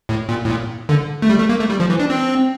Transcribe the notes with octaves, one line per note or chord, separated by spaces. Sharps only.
A2
A#2
A2
A#2
D3
A3
G3
A3
A#3
A3
G3
F3
E3
D4
C4